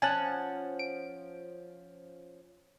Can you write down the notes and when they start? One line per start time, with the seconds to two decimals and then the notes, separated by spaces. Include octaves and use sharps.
0.02 F3 C#4 F#5 G#5 A5 F#6
0.79 D7